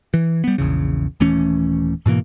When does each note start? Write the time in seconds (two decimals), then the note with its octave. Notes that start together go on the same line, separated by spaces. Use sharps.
0.14 E3
0.44 G3 B3
0.58 A#1 E2 C#3
1.20 D#1 E3 A3 C#4
2.06 G#2 B2 E3 A#3